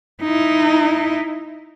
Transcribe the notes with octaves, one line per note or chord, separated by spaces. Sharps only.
D#4 E4